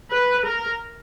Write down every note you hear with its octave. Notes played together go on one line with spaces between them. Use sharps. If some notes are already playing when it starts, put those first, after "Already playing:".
B4
A#4